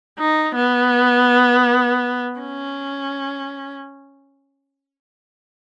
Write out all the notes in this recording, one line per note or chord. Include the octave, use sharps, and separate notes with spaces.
D#4
B3
C#4